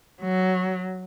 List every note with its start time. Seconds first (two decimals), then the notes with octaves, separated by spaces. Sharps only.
0.22 F#3